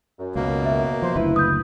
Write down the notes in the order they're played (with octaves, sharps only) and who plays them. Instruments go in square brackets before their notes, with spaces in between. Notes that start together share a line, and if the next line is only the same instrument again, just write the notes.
[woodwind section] F#2
[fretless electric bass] C#2 [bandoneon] B2 A#3
[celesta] E5
[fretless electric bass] F3 [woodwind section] C5 C6
[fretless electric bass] F#1 D2 [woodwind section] E4 B4
[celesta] D#6 G6